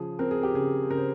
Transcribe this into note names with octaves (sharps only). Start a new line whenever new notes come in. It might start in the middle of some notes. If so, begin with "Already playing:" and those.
Already playing: C#3 F3 G#4
C4 A#4
G#4
G4
C#3 G#4
C#3 A#4
C5